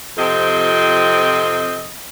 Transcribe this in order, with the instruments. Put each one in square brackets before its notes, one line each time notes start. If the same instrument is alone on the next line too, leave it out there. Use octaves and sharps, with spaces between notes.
[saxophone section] F2 C3 F3 C4 G4 D#5